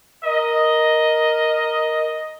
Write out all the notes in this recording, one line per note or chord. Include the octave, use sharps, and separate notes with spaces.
A#4 D#5